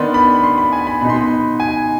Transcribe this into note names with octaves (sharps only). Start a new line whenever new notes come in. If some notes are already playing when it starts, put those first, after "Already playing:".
Already playing: D#3 B3 D4 C6
B5
C6
B5
G#5
B5
B2 B3 D#4 B5
C6
B5
G#5